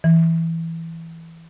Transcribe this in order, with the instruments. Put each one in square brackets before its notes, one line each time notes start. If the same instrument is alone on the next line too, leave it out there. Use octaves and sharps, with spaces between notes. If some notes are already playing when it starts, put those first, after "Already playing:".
[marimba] E3